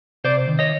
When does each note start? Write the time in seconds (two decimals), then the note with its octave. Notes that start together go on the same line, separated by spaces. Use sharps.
0.24 C3 C5 D5
0.48 D#3
0.59 C#5 D#5